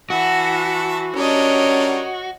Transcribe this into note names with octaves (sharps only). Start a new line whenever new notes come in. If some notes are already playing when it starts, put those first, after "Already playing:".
E3 F#4 E5 A5
G3 C#4 D4 A#4 C#5 D#5